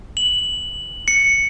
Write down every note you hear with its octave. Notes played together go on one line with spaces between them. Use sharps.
F#7
C#7